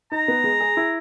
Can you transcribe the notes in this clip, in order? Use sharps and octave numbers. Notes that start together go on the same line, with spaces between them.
D#4 A#5
B3
G#3
G#4
E4